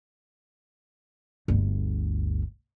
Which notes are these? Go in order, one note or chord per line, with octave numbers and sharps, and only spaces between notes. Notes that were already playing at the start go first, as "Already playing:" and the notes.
G1 D2